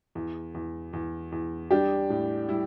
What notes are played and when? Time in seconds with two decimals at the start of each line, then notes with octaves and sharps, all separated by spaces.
0.15 E2
0.54 E2
0.93 E2
1.32 E2
1.71 G3 D4 G4
2.10 A2
2.49 G3 E4